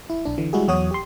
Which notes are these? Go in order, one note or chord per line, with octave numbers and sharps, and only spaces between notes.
E4
B1 D4
D3 E3
G3 G#3 E4 F#4 G#4
E2 F#3 F#4 C#5 D#6
G4 C6